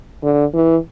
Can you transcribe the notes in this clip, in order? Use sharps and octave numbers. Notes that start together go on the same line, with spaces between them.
D3
E3